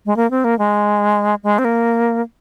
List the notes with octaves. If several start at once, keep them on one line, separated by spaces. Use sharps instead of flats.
G#3
A#3
C4
A#3
G#3
G#3
C4
A#3